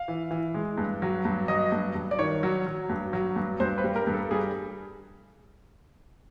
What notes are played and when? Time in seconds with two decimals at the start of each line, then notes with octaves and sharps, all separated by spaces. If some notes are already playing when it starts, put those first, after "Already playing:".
Already playing: F5
0.08 E3
0.31 E3
0.54 G#3
0.78 G2
1.02 F#3
1.25 G2
1.48 F#3 D#5
1.72 G2
1.95 G2
2.11 D5
2.19 D#3 C#5
2.43 F#3
2.67 F#3
2.90 G2
3.13 F#3
3.36 G2
3.60 G2 C5
3.78 B4
3.84 G3
3.96 A#4
4.07 G2
4.13 A4
4.31 G3 G#4